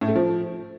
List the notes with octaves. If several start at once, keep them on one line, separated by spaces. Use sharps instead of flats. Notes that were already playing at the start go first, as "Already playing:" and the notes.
A2
A3
F3